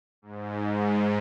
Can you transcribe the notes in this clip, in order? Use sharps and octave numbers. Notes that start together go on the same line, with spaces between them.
G#2